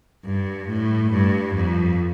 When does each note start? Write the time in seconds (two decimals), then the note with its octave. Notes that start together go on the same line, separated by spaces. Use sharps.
0.24 G2
0.68 A2
1.11 G2
1.54 F2